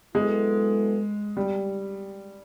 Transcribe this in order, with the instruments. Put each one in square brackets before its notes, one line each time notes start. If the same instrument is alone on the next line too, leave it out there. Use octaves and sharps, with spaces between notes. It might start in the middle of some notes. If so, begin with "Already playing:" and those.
[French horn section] F#3 B3 E4 A4 [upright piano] G#3
[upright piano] G3